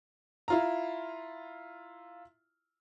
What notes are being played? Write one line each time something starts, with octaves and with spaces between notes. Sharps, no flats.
E4 F4 A#5